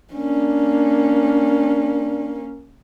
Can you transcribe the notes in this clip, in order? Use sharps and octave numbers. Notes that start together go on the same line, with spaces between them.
A#3 C#4 D4